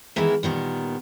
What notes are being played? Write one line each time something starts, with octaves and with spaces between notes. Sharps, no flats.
D#3 E3 G#3 B3 E4 A#4
A#2 D#3 G3 B3